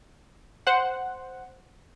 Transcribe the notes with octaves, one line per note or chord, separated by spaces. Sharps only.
C5 F#5